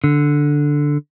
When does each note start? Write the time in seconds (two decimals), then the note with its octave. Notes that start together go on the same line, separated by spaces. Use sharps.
0.04 D3